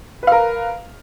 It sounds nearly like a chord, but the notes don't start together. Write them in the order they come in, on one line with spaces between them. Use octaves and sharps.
B4 F5 A#4